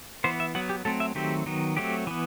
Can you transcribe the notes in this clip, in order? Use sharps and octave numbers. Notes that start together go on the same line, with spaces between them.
E3 B3 C5
E5
F#3 B3 F#5
G4
F#3 A3 C4 A4
E5
D#3 F#3 A3 C4 G4
D#3 F#3 B3
F#3 A3 C4 G4
E3 B3